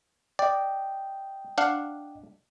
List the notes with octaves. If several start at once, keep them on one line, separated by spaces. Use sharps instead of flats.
D5 D#5 G5
D4 F5 F#5